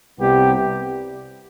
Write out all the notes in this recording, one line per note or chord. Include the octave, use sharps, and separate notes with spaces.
C2 C3 G3 B3 G4